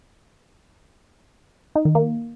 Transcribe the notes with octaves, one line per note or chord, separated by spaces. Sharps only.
D#4
D#3
A#3